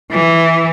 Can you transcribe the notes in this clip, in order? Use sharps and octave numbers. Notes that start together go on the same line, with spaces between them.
E3